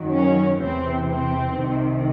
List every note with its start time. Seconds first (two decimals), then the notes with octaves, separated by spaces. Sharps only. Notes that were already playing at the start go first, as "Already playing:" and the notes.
Already playing: F#2 D#3 F#3
0.12 C#4
0.59 E2 C3 E3 C4
1.07 C4
1.54 C2 C3 D#3